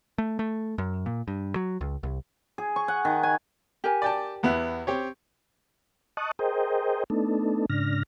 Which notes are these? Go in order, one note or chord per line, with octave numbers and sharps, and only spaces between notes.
A3
A3
F#2
A#2
G2
F#3
C#2
C2
G#4
C#6
F#5
D#3
G#5
G4 A#4 G#5
D5 G5 A5
E2 B3 E4
C4 G4 C#5
D#5 A5 C#6 D#6 F#6
G#4 A#4 C5 D#5 G5
A3 B3 D4 D#4 A4
G#2 C#3 D4 F6 A#6